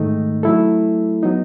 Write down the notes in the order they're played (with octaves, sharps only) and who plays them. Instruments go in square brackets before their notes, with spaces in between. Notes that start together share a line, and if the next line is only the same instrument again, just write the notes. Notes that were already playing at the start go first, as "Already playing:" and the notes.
Already playing: [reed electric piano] G#2 D#3 A3 D#4
F#3 A3 E4 A4
F#3 B3 D#4